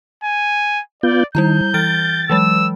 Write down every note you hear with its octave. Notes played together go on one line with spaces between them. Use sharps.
G#5
B3 F4 D5 G6
D#3 G3 E4 A#5 G6
E3 F6 A6 D7
E3 F#3 G#3 E6